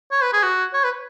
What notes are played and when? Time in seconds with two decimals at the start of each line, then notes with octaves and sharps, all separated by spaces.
0.12 C#5
0.22 B4
0.33 G#4
0.43 F#4
0.74 C#5
0.84 B4